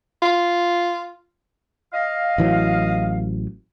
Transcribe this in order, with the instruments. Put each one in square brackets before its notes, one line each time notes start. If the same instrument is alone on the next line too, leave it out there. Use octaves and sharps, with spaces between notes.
[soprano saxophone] F4
[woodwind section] D#5 F5
[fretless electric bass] A1 E3 F#3